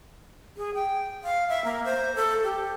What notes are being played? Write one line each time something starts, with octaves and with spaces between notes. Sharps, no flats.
G#4
G5
F5
E5
A#3
C5
A4
G4